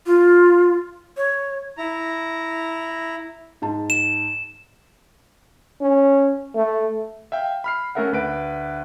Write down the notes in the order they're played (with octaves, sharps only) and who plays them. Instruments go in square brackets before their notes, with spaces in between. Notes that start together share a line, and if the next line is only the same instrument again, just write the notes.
[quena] F4
C#5
[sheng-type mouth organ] E4 A#5
[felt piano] G#2 A5
[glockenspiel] E7
[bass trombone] C#4
A3
[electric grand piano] E5 F5 G5
B5 F6 C7
A3 C#4 A4 A#4 E5 F#5
D2 B4 D7